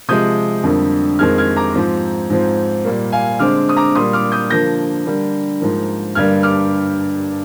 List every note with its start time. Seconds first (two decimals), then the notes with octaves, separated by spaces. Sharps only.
0.08 C3 F3 G#3 C4 D#6 G6
0.63 F2 D3 G3 A#3
1.19 F2 D#3 G#3 C4 F6 G#6
1.38 F6 G#6
1.57 A#5 D6
1.75 G#2 F3 C4
2.30 G#2 F3 C4
2.84 A#2 G3 A#3
3.12 F5 G#5
3.39 D3 G#3 C4 D6 F6
3.69 D#6
3.77 A#5 D6
3.95 A#2 G3 A#3 C6 D#6
4.13 D6 F6
4.32 D#6 G6
4.50 D3 F3 A#3 G6 A#6
5.05 D3 G3 A#3
5.60 G#2 F3 A#3
6.15 G2 D3 G3 A#3 F6 G#6
6.43 D6 F6